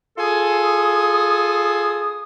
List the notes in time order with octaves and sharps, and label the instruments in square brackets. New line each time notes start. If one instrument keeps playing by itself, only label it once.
[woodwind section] F4 G#4 A4 G#5 C6 D#6